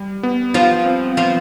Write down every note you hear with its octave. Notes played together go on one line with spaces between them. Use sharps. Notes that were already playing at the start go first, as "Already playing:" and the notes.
Already playing: G3
B3
F3 F4
C4
F3 F4